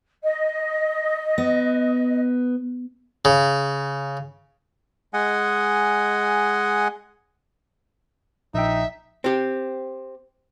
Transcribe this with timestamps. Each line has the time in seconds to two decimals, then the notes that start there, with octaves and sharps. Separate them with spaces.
0.23 D#5
1.38 B3
3.25 C#3
5.14 G#3 D#5 F#5 G#5
8.54 A#1 D#4 E5 G5
9.24 C4 G4